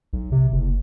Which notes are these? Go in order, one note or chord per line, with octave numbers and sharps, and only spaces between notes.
B1
C3
F#1